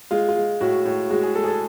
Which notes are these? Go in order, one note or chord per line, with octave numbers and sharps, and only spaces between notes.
G#3 F4
F4
G#3
A2 F#4
A2
G#3 F#4
G#4
G#3 A4
G#4
A4